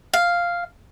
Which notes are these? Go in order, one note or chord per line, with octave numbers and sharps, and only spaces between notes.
F5